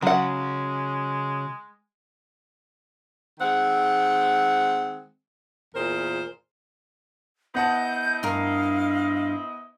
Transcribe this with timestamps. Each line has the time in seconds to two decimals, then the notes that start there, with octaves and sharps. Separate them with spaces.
0.02 C#3 F#3 G#3 F#5
3.39 D#3 G#3 C4 F#5
5.75 E2 A#2 G#4 A#4 C5
7.55 B3 E4 C5 D#5 F#5 A5 G6
8.23 G2 A#4 F5